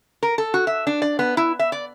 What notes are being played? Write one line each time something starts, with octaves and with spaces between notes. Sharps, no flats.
A#4
A4
F#4
E5
D4
D5
B3
E4
E5
D5